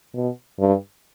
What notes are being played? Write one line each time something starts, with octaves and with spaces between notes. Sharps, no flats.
B2
G2